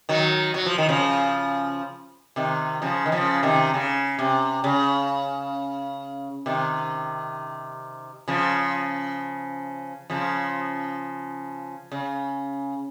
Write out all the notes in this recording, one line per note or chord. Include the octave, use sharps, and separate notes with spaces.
D#3 F#3
F#3
F3
D#3
C#3 F3
C3 D#3
C#3 F3
D#3
C#3 F3
C3 D#3
C#3
C3
C#3
C3 D#3
C#3 F3
C#3 F3
C#3